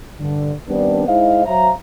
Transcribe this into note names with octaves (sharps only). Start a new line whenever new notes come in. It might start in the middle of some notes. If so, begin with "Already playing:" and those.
G2 D3
D#3 G3 B3 C4 D4
G#3 D#4 E4 C5 D#5 F5
F#3 C5 E5 F5 A#5